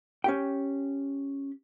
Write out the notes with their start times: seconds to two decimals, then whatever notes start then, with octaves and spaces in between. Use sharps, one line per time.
0.24 C#4 G4 G5